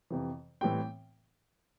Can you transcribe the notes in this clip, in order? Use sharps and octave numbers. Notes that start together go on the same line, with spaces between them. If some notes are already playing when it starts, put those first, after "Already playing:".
F2 C3 E3
A2 E3 G3 C4 G5